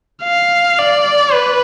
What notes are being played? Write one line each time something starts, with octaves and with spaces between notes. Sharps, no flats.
F5
D5
B4